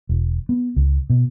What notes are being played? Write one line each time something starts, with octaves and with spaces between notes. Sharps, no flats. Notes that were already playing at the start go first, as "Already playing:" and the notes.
E1
B3
C#2
B2